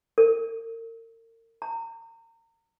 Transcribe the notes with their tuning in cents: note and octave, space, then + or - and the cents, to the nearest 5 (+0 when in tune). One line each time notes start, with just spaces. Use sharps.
A#4 -40
A#5 -30